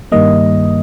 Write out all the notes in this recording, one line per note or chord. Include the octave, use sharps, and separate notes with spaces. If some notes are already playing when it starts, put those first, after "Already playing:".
G2 D#3 G3 A#3 D#5